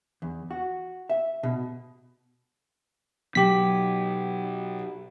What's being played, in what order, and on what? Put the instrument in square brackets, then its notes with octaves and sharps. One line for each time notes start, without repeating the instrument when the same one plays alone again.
[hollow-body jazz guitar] E2
F#4
E5
B2
[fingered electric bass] B2 F#3 B3 [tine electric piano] G4 B6